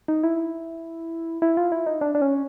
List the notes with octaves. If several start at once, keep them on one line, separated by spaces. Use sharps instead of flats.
D#4
E4
E4
F4
E4
D#4
D4
D4
C#4